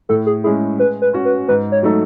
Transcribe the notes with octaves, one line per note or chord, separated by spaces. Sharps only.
A2 A4
G#4
G#3 C#4 E4 G#4
G#3 B4
B4
C#4 F#4
B4
G#2 B4
C#5
F#3 A3 D#4 A4